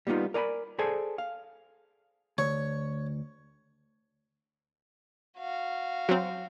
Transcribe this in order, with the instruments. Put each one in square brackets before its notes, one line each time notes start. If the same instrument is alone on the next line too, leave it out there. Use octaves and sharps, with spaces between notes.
[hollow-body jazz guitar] G3 A#3 B3 D#4 F4
A#4 D5 G#5 A#5 B5
G#4 A4 C5 D5 G#5 A5
F5
[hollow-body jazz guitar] D2 [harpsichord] C#5
[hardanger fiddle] F#4 F5
[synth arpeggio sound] F#3 C4